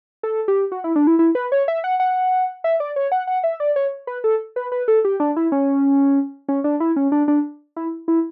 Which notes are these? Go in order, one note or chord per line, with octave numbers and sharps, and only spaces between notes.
A4
G4
F#4
E4
D4
E4
E4
B4
C#5
E5
F#5
F#5
E5
D5
C#5
F#5
F#5
E5
D5
C#5
B4
A4
B4
B4
A4
G4
D4
E4
C#4
C#4
D4
E4
C#4
D4
D4
E4
E4